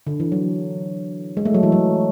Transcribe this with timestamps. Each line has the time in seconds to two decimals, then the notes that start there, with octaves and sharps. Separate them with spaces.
0.07 D3
0.20 E3
0.32 F#3
1.37 G#3
1.45 A3
1.54 F#3
1.63 E3
1.72 F#3